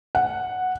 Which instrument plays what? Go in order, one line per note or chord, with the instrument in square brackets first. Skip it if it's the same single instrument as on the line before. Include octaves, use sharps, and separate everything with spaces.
[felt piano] F#5